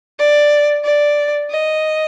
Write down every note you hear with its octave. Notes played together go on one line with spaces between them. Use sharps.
D5
D5
D#5